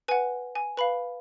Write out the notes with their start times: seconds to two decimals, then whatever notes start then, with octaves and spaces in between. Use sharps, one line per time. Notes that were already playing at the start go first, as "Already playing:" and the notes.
0.08 B4 G#5
0.11 F#5
0.55 G#5
0.77 B4 F5 B5